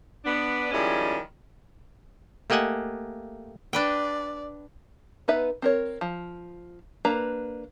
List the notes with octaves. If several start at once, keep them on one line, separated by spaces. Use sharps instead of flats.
B3 D4
D#3 F3 G3 G#3 C#4 E4
A3 A#3 G4 D#5 F#5 G#5
D4 B4 D5 G5
B3 D#4 B4 E5
C4 A#4 C#5
F3
A#3 D4 B4 A#5